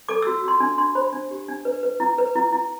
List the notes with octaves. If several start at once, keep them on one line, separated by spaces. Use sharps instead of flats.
A4 D6
E6
F#4
F#4 C6
D4
D4 C6
C5 B5
D4
G4
D4
B4
B4
E4
B4
E4
E4